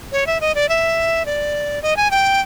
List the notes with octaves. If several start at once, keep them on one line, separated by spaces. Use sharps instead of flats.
C#5
E5
D#5
D5
E5
D5
D#5
G#5
G5